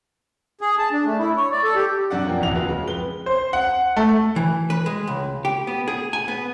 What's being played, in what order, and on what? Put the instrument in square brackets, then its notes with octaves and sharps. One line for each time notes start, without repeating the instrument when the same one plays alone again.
[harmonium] G#4
A5
D4
A3
E4
C#5
D5
A4
G4
[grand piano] F#2 D4 D5 F#5
F3 A#3 C4
D1 E2 E4 F#5 F7
F4 F#4 G#4 B4
C#3 G#3
F2 B4 G7
C5
F#5
A3
[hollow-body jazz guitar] E3
B4
G#3
C#2
G4
B3
G#4
G#5
B3